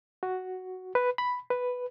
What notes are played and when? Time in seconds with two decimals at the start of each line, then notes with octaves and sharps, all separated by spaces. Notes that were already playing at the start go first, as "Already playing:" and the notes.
0.23 F#4
0.95 B4
1.18 B5
1.50 B4